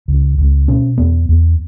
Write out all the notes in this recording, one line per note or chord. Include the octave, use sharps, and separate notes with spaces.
C#2
C#2
B2 C#4
E2 B3
E2